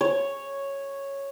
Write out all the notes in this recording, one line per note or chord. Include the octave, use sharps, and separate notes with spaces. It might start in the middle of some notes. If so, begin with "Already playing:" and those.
C#5